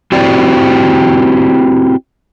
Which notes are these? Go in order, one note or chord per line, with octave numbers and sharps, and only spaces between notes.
C4 E4 F#4 G4 C5 D5